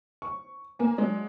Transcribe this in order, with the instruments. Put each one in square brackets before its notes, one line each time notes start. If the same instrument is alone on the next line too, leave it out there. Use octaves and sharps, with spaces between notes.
[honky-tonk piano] C#6
A#3 G#5
F#3 G#3 D4